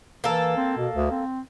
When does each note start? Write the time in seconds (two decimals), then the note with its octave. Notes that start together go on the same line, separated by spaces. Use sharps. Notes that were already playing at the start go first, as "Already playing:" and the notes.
0.24 E3 A#3 A4
0.57 C4
0.78 B2
0.93 D2
1.11 C4